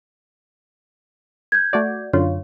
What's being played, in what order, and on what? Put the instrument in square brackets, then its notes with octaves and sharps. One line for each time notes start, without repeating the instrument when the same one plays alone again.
[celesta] G6 G#6
[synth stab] A3 F#4 D5
[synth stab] F#2 D3 F4 [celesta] C#5